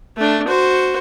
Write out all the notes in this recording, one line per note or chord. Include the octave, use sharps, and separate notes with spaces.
A3 D4
F#4 C5